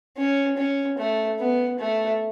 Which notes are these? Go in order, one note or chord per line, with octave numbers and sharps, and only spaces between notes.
C#4
C#4
A3
B3
A3